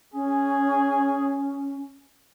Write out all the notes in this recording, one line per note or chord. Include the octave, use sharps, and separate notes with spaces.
C#4 G#4